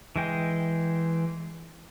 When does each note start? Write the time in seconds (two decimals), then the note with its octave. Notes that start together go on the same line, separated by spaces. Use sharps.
0.16 E3 G#3 G5